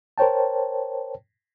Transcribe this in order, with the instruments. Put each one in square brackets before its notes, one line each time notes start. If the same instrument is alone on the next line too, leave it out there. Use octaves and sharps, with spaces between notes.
[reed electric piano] A#4 C5 C#5 G5 A5